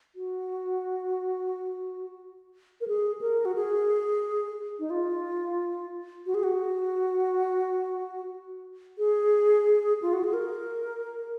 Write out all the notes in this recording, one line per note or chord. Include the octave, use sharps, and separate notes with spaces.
F#4
A#4
G#4
A#4
F#4
G#4
D#4
F4
F#4
G#4
F#4
G#4
F4
F#4
G#4
A#4